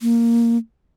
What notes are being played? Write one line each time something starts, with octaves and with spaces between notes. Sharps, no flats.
A#3